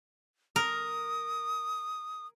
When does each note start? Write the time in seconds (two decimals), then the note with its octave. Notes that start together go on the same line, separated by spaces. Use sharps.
0.56 A#4 D#6